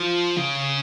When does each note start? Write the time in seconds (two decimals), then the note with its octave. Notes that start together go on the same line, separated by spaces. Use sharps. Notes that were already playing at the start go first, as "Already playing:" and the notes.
Already playing: F3
0.37 C#3